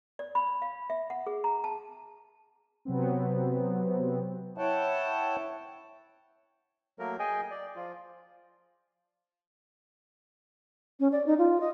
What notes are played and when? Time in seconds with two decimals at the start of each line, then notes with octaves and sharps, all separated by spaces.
0.19 D5
0.35 B5
0.62 F5
0.90 E5
1.10 F#5
1.26 G#4
1.44 A#5
1.64 A5
2.85 C3 F#3 B3 C4
4.58 E4 C#5 F#5 G5 A5
6.99 F#3 A3 A#3 A#4
7.19 G#4 D#5 G5 G#5
7.51 D5
7.76 F3 F4
11.00 C#4
11.12 D5
11.26 D#4
11.38 F4
11.60 D#5